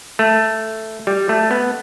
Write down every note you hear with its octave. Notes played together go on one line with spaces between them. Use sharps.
A3
G3
A3
B3